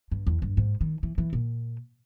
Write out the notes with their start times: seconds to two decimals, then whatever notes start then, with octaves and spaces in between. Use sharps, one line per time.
0.12 G2
0.27 E2
0.42 G2
0.57 G#2
0.81 D#3
1.03 E3
1.18 E3
1.33 A#2